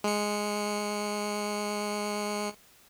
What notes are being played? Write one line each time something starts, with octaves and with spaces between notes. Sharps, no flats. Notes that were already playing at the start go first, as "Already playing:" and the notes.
G#3 C#7